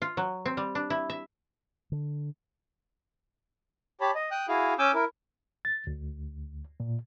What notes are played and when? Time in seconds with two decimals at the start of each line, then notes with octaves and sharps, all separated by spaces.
0.02 F4
0.17 F#3
0.46 C4
0.57 G3
0.75 D4
0.90 E4
1.10 E5
1.92 D3
4.01 G4 C#5 A5 B5
4.15 D#5
4.31 G5 D#6 F#6
4.49 E4 F#4 G#4 F5
4.79 C#4 G#5 D6 E6 G6
4.94 E4 A#4
5.65 A6
5.87 D2
6.80 A#2